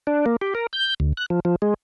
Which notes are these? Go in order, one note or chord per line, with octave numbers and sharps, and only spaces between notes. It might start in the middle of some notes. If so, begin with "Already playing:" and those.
D4
A#3
G4
A#4
G6
D2
F#6
F3
F3
G#3